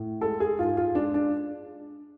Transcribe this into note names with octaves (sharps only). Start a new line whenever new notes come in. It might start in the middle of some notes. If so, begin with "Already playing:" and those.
Already playing: A2
G#3 A4
G#4
G#2 F4
F4
G#3 D4
D4